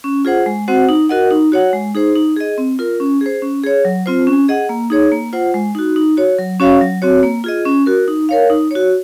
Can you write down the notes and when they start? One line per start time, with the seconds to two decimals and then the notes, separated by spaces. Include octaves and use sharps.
0.04 C#4
0.25 F4 G#4 C5 F#5
0.46 G#3
0.68 C4 F#4 C5 F#5
0.89 D#4
1.09 F#4 A#4 D#5 F#5
1.31 D#4
1.52 F#4 C#5 F#5
1.73 G#3
1.94 D#4 G#4 C5
2.16 D#4
2.37 G#4 D#5
2.58 C4
2.79 F4 A#4
3.00 C#4
3.21 G#4 C5
3.42 C#4
3.64 G#4 C#5
3.85 F#3
4.06 C4 F4 C5
4.27 C#4
4.48 G#4 D#5 F#5
4.69 A#3
4.90 D#4 G#4 C#5
5.12 A#3
5.33 F4 C5 F#5
5.54 G#3
5.75 D#4 F#4
5.96 D#4
6.17 F#4 C#5
6.38 F#3
6.60 C#4 F#4 C#5 F5
6.81 F#3
7.02 C4 F#4 C#5
7.23 A#3
7.44 F4 G#4 D#5
7.65 C#4
7.86 F#4 A#4
8.08 D#4
8.29 A#4 C#5 F5
8.50 D#4
8.71 F#4 C#5